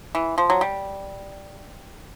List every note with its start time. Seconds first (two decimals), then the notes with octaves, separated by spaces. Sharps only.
0.15 E3
0.38 F3
0.50 F#3
0.61 G3